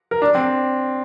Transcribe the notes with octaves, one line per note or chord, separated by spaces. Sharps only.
A#4
D4
C4